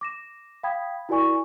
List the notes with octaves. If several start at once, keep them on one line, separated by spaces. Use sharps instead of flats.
D6 A#6 E7
F5 G5 B5 D#6 G#6 B6
E4 F#4 A#4 D5 G#5 C#6